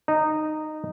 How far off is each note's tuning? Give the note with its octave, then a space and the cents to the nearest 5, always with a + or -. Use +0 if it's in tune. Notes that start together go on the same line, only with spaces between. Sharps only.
D#4 -10